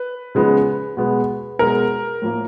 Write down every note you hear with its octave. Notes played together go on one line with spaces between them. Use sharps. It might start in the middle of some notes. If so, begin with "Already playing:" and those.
Already playing: B4
C#3 F3 G#3 B3
B2 G#3 B3
B2 G#3 B3 A#4
A2 F3 A#3